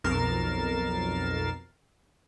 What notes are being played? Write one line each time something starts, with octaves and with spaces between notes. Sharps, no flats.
B1 F2 A#4 A6 C7 E7